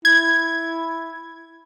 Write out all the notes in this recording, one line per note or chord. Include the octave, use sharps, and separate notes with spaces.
E4 G#6